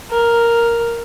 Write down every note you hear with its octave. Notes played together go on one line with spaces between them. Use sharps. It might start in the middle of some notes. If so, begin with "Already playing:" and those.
A#4